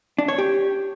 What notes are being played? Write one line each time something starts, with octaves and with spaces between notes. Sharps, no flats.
D4
C#5
G4